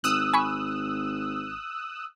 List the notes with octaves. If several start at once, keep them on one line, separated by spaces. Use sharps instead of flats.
G#1 D#6 E6 F#6
G#5 B5 C#6